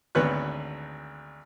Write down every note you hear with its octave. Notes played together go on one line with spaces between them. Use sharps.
G#1 D2 B3 B4 C#5 F#6